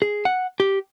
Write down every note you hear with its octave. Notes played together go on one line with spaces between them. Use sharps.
G#4
F#5
G4